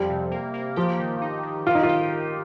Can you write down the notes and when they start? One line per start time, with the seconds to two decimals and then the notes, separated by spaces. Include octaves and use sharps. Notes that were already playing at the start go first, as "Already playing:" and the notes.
Already playing: F2 F3 G3
0.10 C3
0.31 A#3
0.54 A#3
0.76 F3 G4
0.99 D#3
1.21 D#4
1.43 D#3
1.66 F4 G4
1.75 D#4
1.83 F4
1.89 G4